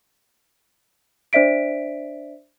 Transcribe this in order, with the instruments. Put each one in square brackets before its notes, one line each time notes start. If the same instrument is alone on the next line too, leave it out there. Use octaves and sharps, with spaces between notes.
[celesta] D4 C5 D5 E5 B6 D7